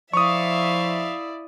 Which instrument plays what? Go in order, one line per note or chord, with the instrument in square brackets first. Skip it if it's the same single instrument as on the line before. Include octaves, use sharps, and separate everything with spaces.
[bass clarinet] F3 [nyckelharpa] E4 D5 [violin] E5 F5 [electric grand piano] C#6 D#6